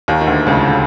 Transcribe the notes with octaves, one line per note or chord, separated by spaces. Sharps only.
D#2 D#3
D#3
D2 D3
C#2 C#3
D3